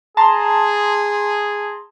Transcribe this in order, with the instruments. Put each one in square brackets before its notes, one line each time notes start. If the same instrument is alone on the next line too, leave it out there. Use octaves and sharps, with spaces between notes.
[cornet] G#4 [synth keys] A5 A#5 C6